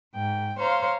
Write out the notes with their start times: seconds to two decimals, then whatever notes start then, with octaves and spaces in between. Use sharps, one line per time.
0.15 G#2 G5
0.59 C5 C#5 F5 A#5 C6